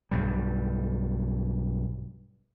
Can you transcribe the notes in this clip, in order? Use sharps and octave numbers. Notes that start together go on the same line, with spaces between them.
B1 G2 G3